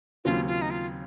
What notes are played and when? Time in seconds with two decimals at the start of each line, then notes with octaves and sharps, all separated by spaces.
0.25 D#2 C#3 F#3 C4 F4
0.47 F4
0.62 D#4
0.70 F4